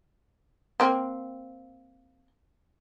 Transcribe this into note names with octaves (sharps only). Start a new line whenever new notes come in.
A#3 C4